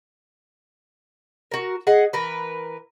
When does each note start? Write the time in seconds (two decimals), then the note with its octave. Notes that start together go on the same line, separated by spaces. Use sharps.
1.52 F#4 A#4
1.87 G#4 D#5 F#5
2.13 E3 A#4 B4